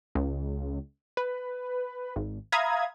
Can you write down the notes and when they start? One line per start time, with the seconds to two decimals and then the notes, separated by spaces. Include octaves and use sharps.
0.15 C#2
1.17 B4
2.16 G#1
2.52 E5 F5 A#5 B5 D#6 G#6